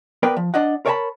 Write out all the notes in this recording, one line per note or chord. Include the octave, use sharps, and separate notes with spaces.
B3 A#4 B4 D5 G5
F3
D4 D5 D#5 F#5
A#4 C#5 D5 G#5 A5 B5